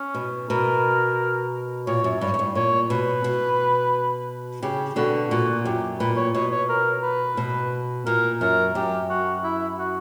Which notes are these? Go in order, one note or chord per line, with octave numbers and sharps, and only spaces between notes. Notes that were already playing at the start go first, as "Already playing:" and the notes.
Already playing: C#4
B2
B2 A#4
A#2 C#5
F#2
G2 C#5
F#2
G2
A#2 C#5
B2 B4
B2
C#3 G4
B2 D3 F#4
A#2 F#4
F#2 G4
A#2 B4
C#5
B2 C#5
C#5
A#4
B4
B2
A#2 A#4
F#2 A#4
F#2 G4
F#4
E4
F#4